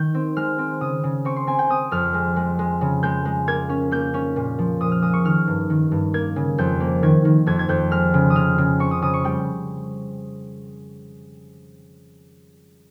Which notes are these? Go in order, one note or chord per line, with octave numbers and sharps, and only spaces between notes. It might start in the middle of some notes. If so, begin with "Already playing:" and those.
Already playing: D#3 G6
C4
G#3 F6
C4
C#3 D#6
C#3
C4 C#6
C6
C4 G#5
G5
C4 D#6
F2 F6
G#3
G#3
G#3
C#3
G#3 G6
G#3
A#3 G#6
C#4
A#3 G6
C#4
A#2
F3
A#2 D#6
F6
G#3 D#6
C#6
D#3 F6
G2
D#3
G2
A#3 G#6
C#3
F2 G6
A#3
D#3 G#6
D#3
F2 G#6
G#6
F2 G6
G#3 F6
C#3
D#6
C#3 F6
C#3
C4 C#6
D#6
C#3 D#6
C#6
G3 G5